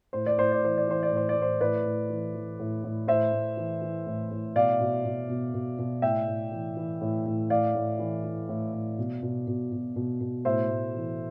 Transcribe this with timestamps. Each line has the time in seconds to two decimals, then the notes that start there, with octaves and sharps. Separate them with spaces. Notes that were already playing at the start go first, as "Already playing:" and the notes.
0.13 A2 C5
0.26 D5
0.38 A2 C5
0.52 D5
0.62 E3 C5
0.78 D5
0.87 E3 C5
1.03 D5
1.11 A2
1.17 C5
1.29 D5
1.37 A2
1.42 C5
1.61 A2 B4 D5
1.85 A2
2.10 E3
2.34 E3
2.60 A2
2.84 A2
3.07 A2 C5 E5
3.32 A2
3.57 E3
3.82 E3
4.06 A2
4.31 A2
4.55 B2 D5 F5
4.81 B2
5.05 B2
5.29 B2
5.54 B2
5.79 B2
6.02 A2 E5 G5
6.28 A2
6.52 E3
6.77 E3
7.01 A2
7.26 A2
7.50 A2 D5 F5
7.75 A2
7.99 E3
8.24 E3
8.49 A2
8.73 A2
8.98 B2
9.23 B2
9.47 B2
9.72 B2
9.96 B2
10.21 B2
10.45 A2 C5 E5
10.69 A2
10.94 E3